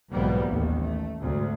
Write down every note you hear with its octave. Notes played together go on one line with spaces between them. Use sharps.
B1 G#2 E3 G3 A#3 B3
A1 D#2
A3
D2 G#2